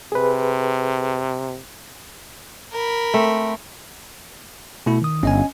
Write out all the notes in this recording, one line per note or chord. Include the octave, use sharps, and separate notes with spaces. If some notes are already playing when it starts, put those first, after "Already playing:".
C3 G#4 B4
A#4 B5
A3 C4
B2 A3 E4
D#3 D#6
G1 C#4 D#5 G#5